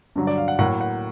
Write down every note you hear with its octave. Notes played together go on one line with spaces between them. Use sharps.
G2 D3 F#3
D5
F5
F#5
A2 F#3 A#3 F#5
F#5